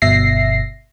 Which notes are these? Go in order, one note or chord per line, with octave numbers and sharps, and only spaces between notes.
G1 B2 E5 A#6 C7